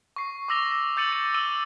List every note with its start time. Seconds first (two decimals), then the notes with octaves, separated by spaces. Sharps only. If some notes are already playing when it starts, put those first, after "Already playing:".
0.16 C#6 C7
0.48 C#6 D6 E6 A#6 F7 G7
0.71 A#6
0.97 D6 G6 A6 C#7 D#7 F#7
1.13 D#7
1.34 E6 D#7 F#7 G7